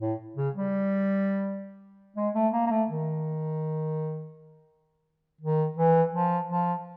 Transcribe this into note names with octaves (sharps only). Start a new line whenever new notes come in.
A2
C#3
G3
G#3
A3
A#3
A#3
A3
D#3
D#3
E3
F3
F3